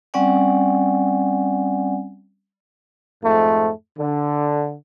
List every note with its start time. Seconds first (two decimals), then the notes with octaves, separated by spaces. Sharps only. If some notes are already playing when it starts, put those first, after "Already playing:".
0.14 G3 C4 C#4 D5 F#5 G#5
3.23 F2 G#2 A3
3.97 D3